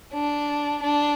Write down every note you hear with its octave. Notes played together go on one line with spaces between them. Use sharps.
D4
D4